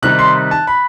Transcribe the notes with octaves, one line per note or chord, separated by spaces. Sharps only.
C3 D#3 G3 D#4 F#6
C6
A5
B5